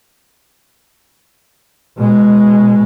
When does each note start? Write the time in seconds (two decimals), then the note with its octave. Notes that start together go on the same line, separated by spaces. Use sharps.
1.98 B2 G#3